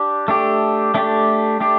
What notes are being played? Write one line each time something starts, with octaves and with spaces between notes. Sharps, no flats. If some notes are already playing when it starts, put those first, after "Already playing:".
Already playing: D4 G4
A3 D4 G4
A3 D4 G4
A3 D4 G4